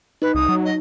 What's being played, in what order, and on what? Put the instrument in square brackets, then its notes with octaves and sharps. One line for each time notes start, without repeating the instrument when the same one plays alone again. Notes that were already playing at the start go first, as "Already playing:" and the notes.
[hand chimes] D#4 [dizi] B4
[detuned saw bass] C2 [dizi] D#6
[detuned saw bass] F#3
[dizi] D#5